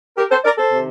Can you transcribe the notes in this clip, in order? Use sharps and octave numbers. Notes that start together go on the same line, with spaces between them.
G4 A#4
A4 C5
A#4 D5
A4 C5
C3 D#3